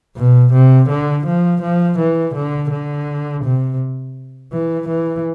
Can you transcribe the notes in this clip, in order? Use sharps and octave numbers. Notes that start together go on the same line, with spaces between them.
B2
C3
D3
F3
F3
E3
D3
D3
C3
E3
E3